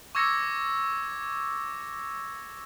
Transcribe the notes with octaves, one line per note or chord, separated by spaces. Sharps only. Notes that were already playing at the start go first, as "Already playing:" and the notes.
C#6 D6 E6 G#6 A#6 C#7